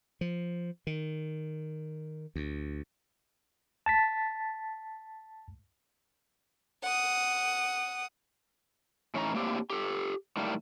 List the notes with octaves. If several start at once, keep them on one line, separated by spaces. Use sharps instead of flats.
F3
D#3
D2
A5 A6 B6
F#5 D#6
A2 E3 C#4 D#4 G#4 A#5
A2 A#3 C4 D4 G4
G4 A4
A2 D#3 G3 A3 A#3